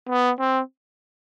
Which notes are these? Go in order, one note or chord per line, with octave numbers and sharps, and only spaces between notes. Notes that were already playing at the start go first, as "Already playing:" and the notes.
B3
C4